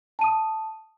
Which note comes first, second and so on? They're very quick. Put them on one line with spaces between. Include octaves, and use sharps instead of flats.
A5 D#7 D#6